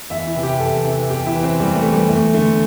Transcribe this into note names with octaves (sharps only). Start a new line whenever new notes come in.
E2 E5
E4
C3 E3
G4
E2 A4
C3 E3
E2 G4
E4
E3
C4
E2 G3
A3
E3
G3
E2 A3
D3 A3